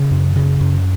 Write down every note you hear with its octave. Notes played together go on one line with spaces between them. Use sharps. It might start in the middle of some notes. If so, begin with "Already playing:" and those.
Already playing: C#3
F#2
C#3
F#2